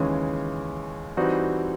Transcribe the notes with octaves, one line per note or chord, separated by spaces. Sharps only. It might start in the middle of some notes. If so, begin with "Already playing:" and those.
Already playing: D#2 C#3 E3 G#3 C#4
E3 G3 C4 D#4 F#4